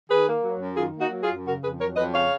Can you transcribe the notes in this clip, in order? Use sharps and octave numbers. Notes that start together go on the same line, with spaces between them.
D#3 G#4 B4
A#3
F#3
F#2
D#3 F4 G#4
A#3
D#4 F#4
F#3
F4 G#4
F#2
C#3 F#4 A#4
F2 G#4 B4
F#3 A#4 C#5
F2 B4 D#5
C#3 C#5 F5